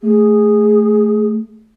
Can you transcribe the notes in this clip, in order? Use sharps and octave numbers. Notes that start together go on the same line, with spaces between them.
A3 G#4